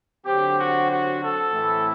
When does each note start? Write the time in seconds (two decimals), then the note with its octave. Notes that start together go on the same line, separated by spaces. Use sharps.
0.24 D3 F#3 C4 G4
0.56 F#4
0.88 F#4
1.19 A4
1.51 A2 E3 A3 C4 E4